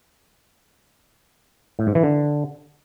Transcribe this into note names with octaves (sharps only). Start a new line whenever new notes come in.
A2
G#2
E3
D3